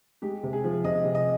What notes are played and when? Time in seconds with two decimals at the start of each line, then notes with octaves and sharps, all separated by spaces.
0.22 G#3 G4
0.43 C3
0.53 G#4
0.64 F3
0.84 C3 D#5
1.04 C3
1.15 D#5